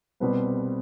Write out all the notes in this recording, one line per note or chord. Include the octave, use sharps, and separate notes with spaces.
C2 B2 G3 C4 B4